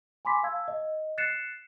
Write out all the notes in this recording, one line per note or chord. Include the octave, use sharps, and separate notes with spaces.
G#5 B5 C6 D6 B6
F5 A5 E6 G#6
D#5
F#6 A6 C7 C#7 E7